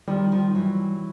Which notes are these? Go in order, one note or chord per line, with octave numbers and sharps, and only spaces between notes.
D#3 F3 G3
D#3 F3
E3 F#3